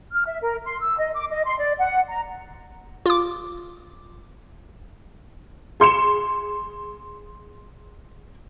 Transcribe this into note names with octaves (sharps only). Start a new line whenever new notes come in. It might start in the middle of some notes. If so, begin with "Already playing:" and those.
F6
E5
A#4
C6
E6
D#5
D6
D#5
C6
D5
F#5
A#5
F4 D6
G#4 C6 C#7 E7